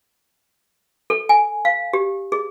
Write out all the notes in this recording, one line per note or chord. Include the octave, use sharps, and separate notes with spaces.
A4
G#5
F5
G4
G#4